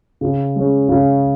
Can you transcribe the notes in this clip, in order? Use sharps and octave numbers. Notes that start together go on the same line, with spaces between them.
C#3
G#3 C#4
C#3